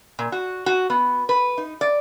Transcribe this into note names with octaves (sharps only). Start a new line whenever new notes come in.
A#2
F#4
F#4
B3
B4
D#4
D5